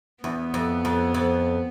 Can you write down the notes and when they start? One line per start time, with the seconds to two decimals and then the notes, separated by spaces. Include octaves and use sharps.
0.24 E2 B3
0.54 F2
0.85 F2
1.14 F2